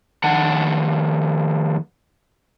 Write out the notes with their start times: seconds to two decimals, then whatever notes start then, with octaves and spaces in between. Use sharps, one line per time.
0.24 F2 D#3 F#5 A5